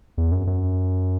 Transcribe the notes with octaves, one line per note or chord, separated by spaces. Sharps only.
E2
F#2
F#2